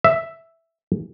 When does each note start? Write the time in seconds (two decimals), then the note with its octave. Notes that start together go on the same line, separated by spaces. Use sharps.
0.04 E5